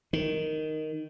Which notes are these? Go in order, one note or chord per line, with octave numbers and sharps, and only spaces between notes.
D#3